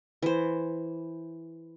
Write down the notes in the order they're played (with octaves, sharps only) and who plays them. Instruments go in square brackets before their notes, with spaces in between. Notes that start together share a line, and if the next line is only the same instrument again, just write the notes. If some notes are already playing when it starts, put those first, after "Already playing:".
[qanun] E3 C5